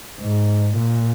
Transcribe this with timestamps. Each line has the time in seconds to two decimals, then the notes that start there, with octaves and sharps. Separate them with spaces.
0.21 G#2
0.77 A#2